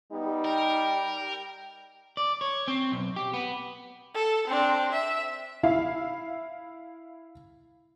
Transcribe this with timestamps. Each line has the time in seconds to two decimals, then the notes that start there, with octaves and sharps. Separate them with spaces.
0.12 G3 B3 D#4
0.45 A#4 G5
2.17 D5
2.41 C#5
2.68 C4
2.92 B1
3.16 G4
3.34 B3
4.14 A4
4.47 C4 D4
4.92 E5
5.63 E4 F5